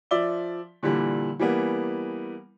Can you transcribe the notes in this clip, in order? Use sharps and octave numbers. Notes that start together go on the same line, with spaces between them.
F3 D5 E5 G7
A#2 D3 E3 G3
E3 G3 A#3 B3